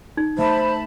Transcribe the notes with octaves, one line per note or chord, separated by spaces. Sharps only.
D#4
A3 C5 E5 A5 B5